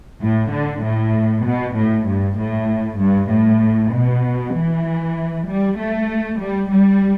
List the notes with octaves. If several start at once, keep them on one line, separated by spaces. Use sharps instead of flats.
A2
D3
A2
B2
A2
G2
A2
G2
A2
B2
E3
G3
A3
G3
G3